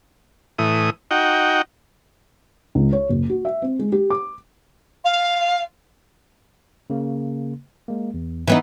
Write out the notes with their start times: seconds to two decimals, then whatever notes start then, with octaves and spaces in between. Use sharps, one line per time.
0.58 A2 E3 D#6
1.11 D#4 F#4 G5
2.75 C#2
2.93 C#5
3.09 F#1
3.29 F#4
3.45 E5
3.62 C4
3.79 G#3
3.92 G4
4.10 D6
5.05 F5
6.90 C#3 A#3
7.88 G#3 A#3
8.14 E2
8.47 E3 B3 D#4